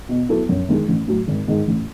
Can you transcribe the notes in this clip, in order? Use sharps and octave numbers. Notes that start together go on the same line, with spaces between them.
B2
F#3 B3 E4 A4
F#2
D#3 G#3
A1
A2 F#3
G#1
G#2 D#3
A1